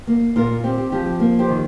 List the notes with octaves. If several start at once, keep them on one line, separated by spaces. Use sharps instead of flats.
A#3
A#2 F4 A#4
C4 G4
G4
F3 G4
G4
A#3
G4 C5
D#3